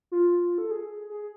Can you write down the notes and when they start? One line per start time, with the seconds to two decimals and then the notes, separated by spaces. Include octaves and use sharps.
0.12 F4
0.58 A4
0.71 G#4
1.10 G#4